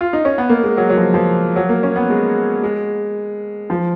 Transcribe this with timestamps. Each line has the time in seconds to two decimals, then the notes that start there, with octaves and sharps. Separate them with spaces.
0.01 F4
0.13 D#4
0.25 C#4
0.38 B3
0.49 A#3
0.63 G#3
0.77 F#3
0.90 F#3
0.98 F3
1.14 F3
1.56 F#3
1.69 A#3
1.83 C#4
1.96 B3
2.10 G#3
2.63 G#3
3.70 F3